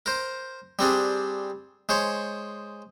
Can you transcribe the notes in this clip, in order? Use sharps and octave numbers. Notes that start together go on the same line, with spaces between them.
A#4 C5
G3 C4 D4 G#4
G#3 C5 C#5